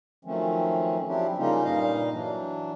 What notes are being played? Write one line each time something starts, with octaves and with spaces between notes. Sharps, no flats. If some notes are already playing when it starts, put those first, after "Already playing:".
D#3 F3 F#3 A3 C4 C#4
F3 F#3 C4 D4 E4 G4
C#3 G3 A#3 C#4 D#4 F4
G2 A#2 G3 D#4 D#5 F5
E3 F#3 D4